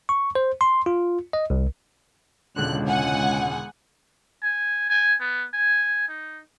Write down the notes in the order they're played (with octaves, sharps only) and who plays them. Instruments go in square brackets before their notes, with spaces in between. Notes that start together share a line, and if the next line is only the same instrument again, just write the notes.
[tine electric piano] C#6
C5
C6
F4
D#5
C2
[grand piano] E1 D3 [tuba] C#2 [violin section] F#6
[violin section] F#5 G#5
[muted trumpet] G#5
G#5
B3
G#5
D#4